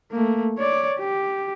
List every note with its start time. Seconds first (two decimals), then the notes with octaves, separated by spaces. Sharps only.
0.11 A3 A#3
0.58 C#5 D5
1.00 G4